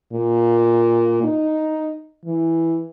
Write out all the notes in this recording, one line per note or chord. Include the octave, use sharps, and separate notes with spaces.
A#2
D#4
E3